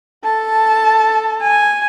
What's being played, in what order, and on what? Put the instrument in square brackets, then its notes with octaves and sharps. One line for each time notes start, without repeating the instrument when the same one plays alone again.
[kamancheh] A4 A5
[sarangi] G#5